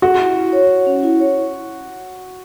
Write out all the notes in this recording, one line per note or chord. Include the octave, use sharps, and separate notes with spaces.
F#4 G#4
E4
E4
C#5
C#5
C#4
E4
C#5